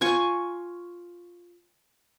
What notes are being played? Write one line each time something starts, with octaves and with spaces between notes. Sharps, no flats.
F4 G#5 C#6